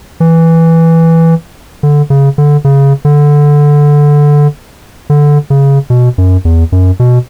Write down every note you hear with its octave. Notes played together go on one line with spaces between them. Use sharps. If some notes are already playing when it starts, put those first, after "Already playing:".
E3
D3
C#3
D3
C#3
D3
D3
C#3
B2
F#2
E2
F#2
B2